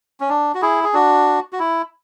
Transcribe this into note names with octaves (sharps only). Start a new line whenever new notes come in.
C#4
D4
F#4
E4 G#4
G#4
D4 F#4
F#4
E4